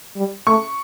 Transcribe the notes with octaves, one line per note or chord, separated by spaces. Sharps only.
G3
A3 C#6